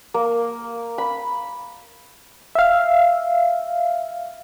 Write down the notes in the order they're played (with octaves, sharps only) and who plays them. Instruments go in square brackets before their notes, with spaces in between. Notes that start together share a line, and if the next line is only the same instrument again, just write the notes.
[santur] A#3
B5
[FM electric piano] E5 F5